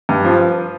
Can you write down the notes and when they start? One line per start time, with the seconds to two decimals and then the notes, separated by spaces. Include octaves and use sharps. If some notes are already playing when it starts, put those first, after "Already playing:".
0.09 G2
0.25 F3